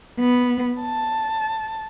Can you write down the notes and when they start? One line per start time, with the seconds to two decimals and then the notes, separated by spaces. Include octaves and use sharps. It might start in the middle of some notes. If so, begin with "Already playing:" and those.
0.20 B3
0.82 A5